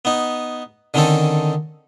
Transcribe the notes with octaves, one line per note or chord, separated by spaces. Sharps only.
B3 D#4
D3 D#3 C4 C#4 D#4 A4